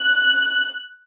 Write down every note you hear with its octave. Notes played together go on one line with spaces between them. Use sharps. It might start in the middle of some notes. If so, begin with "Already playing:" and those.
Already playing: F#6